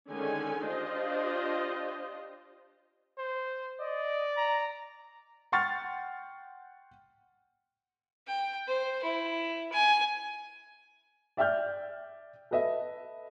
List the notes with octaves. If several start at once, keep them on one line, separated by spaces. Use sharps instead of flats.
D3 D#3 G#3 C#4 G#5
D4 F4 G4 C5 D#5
C5
D5 D#5
A#5
F#5 G5 C6 C#6 F6 A6
G5
C5
E4
G#5
D5 E5 G5 F6 G6
A4 B4 D#5 E5